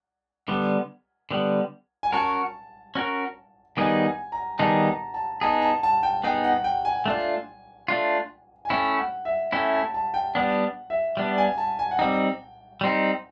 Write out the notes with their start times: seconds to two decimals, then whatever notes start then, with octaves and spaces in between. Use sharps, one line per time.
0.48 D3 G3 B3
1.31 D3 G3 B3
2.03 G#5
2.13 C#4 F#4 A#4 A5
2.95 C#4 F#4 A#4
3.77 D#3 G3 B3 D#4 G#4 G#5
4.04 G#5
4.32 A#5
4.59 D#3 G3 B3 D#4 G#4 A5
4.86 A#5
5.14 A5
5.41 B3 D#4 G#4 A5
5.62 A5
5.83 A5
6.03 G5
6.24 B3 D#4 G#4 G5
6.44 F#5
6.64 G5
6.85 G#5
7.06 A3 D4 F4
7.88 A3 D4 F4
8.65 G#5
8.70 A3 C#4 E4 G5
8.98 F#5
9.25 E5
9.52 A3 C#4 E4 G5
9.73 A5
9.94 A5
10.14 G5
10.35 G3 B3 D4 F#5
10.90 E5
11.17 G3 B3 D4
11.38 G#5
11.58 A5
11.79 G#5
11.91 F#5
11.99 G3 C4 D#4 G5
12.81 G3 C4 D#4